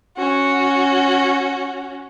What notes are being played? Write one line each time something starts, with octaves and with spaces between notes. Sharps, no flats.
C#4 F#4